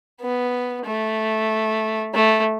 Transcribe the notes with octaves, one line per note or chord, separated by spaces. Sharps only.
B3
A3
A3